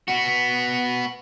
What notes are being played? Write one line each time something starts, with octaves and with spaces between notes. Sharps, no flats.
B3 F#4